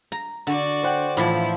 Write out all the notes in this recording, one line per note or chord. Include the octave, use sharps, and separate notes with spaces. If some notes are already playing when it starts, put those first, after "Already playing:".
A#5
D3 F#4 D5
C5 F#5 G5
A2 E3 F3 E4 D5